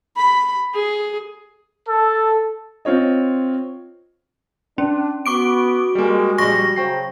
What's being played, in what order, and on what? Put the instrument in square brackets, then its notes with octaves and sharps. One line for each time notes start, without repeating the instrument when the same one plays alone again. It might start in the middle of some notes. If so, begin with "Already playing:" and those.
[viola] B5
G#4
[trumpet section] A4
[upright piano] C4 F4 C#5 D#5
[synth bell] C#4 [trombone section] D4
[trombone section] B3 [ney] F#4 [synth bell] C#6 D6 D7
[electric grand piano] G3 A#3 [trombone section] G#3
[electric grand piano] A#1 G3 [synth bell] C#6 A#6
[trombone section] C#3 F#3 [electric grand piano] C5 G5 C7